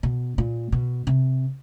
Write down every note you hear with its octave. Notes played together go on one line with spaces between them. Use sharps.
B2
A#2
B2
C3